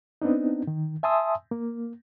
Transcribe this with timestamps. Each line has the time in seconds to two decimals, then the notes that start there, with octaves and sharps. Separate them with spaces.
0.22 B3 C4 D4 D#4
0.67 D#3
1.03 E5 G#5 A5 C6 D#6 E6
1.51 A#3